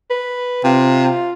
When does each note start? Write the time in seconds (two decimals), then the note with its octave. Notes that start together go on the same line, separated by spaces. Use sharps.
0.10 B4
0.64 C3 F4